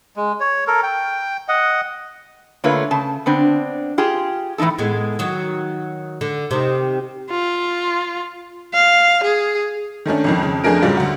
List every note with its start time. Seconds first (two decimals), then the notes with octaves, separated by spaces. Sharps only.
0.16 G#3
0.40 C#5
0.67 A4 A#4
0.83 G5
1.49 D#5 F#5
2.64 D3 A3 A#3 F4 B4 C#5
2.91 C#3 A5
3.26 D3 B3 C4 D4
3.98 F4 G4 G#4
4.58 A2 E3 F3 D#4 A4
4.78 A2 G#3 B3
5.19 D#3 F#3
6.21 D3
6.51 C3 D#3
7.30 F4
8.74 F5
9.24 G#4
10.06 D#3 A3 C#4 D4
10.24 G#1 F2 D#3
10.41 F2 C#3
10.64 F2 A3 D4 G#4 A#4 D7
10.82 G#2 C#3 F#3 G3 F4
10.97 D2 F#4